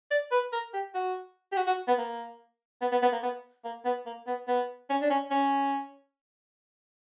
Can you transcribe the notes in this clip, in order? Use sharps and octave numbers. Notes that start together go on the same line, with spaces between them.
D5
B4
A#4
G4
F#4
G4
F#4
F#4
B3
A#3
B3
B3
B3
A#3
B3
A#3
B3
A#3
B3
B3
C#4
D4
C#4
C#4